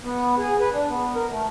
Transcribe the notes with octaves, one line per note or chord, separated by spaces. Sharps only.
B3
G#4
B4
D4
B3
A#4
A3